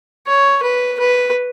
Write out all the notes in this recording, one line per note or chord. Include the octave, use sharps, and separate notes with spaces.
C#5
B4
B4